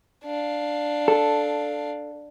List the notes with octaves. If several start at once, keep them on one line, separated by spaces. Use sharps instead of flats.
D4 F5
A4